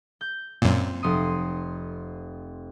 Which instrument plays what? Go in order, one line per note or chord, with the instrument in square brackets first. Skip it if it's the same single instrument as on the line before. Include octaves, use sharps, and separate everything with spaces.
[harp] G6
[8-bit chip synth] F#2 A#2 [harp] C4
[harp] F1 C6 D#6